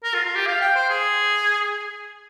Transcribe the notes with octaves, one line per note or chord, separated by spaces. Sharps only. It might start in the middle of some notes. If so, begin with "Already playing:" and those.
A#4
F4
F4
G4
F5
G5
C5
G#4